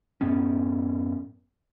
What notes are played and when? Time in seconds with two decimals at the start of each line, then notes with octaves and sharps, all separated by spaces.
0.21 F#2 A2 B3 C#4